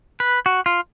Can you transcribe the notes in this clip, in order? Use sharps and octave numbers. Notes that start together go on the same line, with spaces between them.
B4
F#4
F4